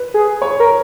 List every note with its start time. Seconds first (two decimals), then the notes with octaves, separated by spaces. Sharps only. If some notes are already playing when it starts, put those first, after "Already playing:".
Already playing: B4
0.14 G#4
0.42 C#5
0.60 A#4